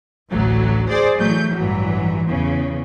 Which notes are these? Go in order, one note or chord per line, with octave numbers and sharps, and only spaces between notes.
A1 D2 F#3
G#4 C5 D5
E3 F#3 A3 G6
A1 G2 E3 F#3
E2 C#3